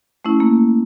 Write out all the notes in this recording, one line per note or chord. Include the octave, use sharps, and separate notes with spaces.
A3 C#4 E4
A#3